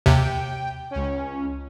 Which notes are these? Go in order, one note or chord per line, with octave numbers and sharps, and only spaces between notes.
D#2 C3 G5
C#2 C#4